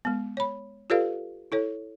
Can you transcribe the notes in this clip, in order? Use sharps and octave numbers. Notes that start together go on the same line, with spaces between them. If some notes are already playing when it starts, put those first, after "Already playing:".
G#3 B3
C#5 B5
F4 G4 A4 B4 D5 F5
E4 A4 C#5